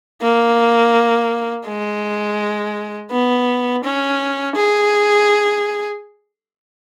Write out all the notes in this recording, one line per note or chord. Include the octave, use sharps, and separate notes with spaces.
A#3
G#3
B3
C#4
G#4